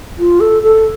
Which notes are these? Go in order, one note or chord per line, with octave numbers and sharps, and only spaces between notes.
F4
A4
A4